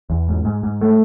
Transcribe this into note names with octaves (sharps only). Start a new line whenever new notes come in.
E2
G#2
G#2
G#2
A3